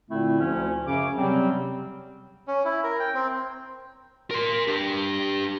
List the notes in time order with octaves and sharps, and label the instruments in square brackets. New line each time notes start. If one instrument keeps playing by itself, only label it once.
[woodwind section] A#2 D3 A3 C4 E4
D2 F3 C#4
F#2 C#3 C#4 D6
C3 F#3 G3 C4
[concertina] C#4
E4
A#4
G5
C4
[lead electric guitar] A#4 C6
D4 G4